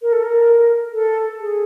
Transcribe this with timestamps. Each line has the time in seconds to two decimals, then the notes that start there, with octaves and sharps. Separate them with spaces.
0.02 A#4
0.13 A4
0.23 A#4
0.93 A4
1.40 G#4